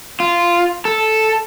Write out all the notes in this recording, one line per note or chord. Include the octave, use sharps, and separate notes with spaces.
F4
A4